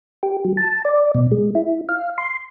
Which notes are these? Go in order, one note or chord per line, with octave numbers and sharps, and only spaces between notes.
G4
F#3
A5
D5
B2
G#3
E4
F5
C6